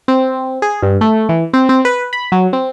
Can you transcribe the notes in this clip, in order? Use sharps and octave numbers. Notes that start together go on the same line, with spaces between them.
C4
G#4
G2
A3
E3
C4
C4
B4
B5
F#3
C4